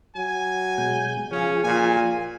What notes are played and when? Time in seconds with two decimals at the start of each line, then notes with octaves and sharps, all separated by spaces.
0.16 F#3 G#5
0.78 B2 G#3 G6
1.31 C#3 F3 C#4 G#4
1.63 A#2 G#5